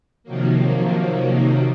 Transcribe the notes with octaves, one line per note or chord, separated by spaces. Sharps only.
C3 D#3 F3 F#3 A#3